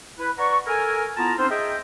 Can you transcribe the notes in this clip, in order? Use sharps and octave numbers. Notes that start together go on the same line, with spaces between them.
E4 B4
B4 D5 F#5 A#5 C#6
A4 A#4 G#5
B3 E4 F4 A5 A#5
C4 C#4 D#4 F4 C5
G#4 D#5 E5 G5